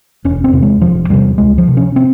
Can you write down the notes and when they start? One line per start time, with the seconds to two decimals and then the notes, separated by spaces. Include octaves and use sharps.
0.25 E1 C#4
0.44 C4
0.53 E2 C3
0.62 G#3
0.81 E1 F3
1.10 E2 C3 G3
1.38 C#2 G#3
1.58 F3
1.68 C3
1.77 C#4
1.96 C4